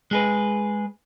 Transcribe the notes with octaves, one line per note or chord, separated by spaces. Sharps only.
G#3 G#4 B4